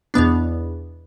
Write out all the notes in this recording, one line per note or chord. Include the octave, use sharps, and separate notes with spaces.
E2 B2 B3 D4